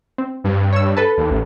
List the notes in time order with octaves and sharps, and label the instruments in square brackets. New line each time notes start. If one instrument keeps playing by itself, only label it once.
[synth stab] C4
[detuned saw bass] G2
[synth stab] C#5 E6
A4 B4 A5
[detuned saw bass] D#2
A1